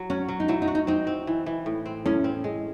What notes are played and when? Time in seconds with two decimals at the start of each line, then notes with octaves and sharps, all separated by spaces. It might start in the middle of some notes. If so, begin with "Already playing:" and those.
Already playing: F#3
0.10 C#4 F#4
0.29 F#3
0.40 D#4
0.48 F#3 E4
0.62 D#4
0.68 F#4
0.75 D#4
0.87 C4 D#4
1.07 C4
1.27 E3
1.46 E3
1.66 A2
1.86 C4
2.06 A2 C#4
2.24 C4
2.44 G#3